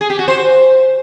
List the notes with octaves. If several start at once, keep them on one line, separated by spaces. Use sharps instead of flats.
G#4
G4
F#4
C5